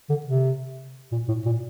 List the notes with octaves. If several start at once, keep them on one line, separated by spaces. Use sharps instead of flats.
D3
C3
A#2
A2
A#2